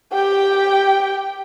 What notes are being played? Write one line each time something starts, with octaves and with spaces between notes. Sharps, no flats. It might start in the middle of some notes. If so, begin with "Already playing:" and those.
G4 G5